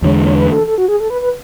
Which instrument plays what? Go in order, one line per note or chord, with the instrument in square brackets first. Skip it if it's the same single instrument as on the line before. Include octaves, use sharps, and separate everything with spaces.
[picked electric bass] E2 D3 G#3 [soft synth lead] C#5
[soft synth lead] C#5
B4
A4
A4
F#4
G#4
A4
B4
B4